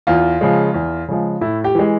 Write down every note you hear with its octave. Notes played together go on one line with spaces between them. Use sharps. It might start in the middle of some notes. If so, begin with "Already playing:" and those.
E2 F4
C#3 F3 G#3
E2
C#3 F3 G#3
A2 E4
G4
E3 G#3